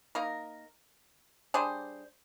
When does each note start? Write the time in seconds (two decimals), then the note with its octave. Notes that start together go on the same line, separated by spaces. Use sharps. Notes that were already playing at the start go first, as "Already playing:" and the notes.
0.15 A#3 D#4 A#4
1.54 G3 D4 G#4 C5